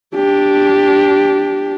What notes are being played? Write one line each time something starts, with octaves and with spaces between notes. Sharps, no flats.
D4 G4